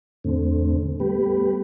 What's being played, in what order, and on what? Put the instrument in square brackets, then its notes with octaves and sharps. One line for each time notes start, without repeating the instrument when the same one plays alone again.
[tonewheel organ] E2 A2 D3 A3 C4
G3 A3 B3 G4 B4